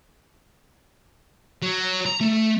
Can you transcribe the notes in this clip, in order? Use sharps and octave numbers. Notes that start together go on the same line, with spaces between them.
F#3
A#5
A3